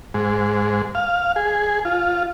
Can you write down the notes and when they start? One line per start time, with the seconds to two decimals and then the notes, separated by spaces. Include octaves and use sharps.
0.14 G#2
0.95 F5
1.36 G#4
1.85 F4